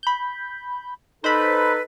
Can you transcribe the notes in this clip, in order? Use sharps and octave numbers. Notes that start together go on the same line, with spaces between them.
B5 G6
D#4 A4 B4 C5 B5